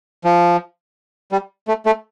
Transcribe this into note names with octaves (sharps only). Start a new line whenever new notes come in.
F3
G3
A3
A3